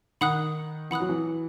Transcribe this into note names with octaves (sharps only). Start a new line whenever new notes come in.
D#3 F#5 B5 D#6 F#6
E3 F#5 B5 D#6 F#6
F#3
E3